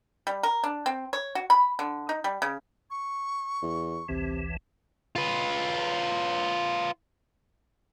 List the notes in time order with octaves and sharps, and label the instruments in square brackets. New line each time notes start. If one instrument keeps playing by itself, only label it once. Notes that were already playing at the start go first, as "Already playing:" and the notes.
[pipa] G3
A#4
D4
C4
C#5
F#4
B5
D3
D#4
G3
C#3
[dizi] C#6
[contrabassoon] E2
[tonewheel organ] A1 D2 E3 [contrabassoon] C3
[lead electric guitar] F4 B4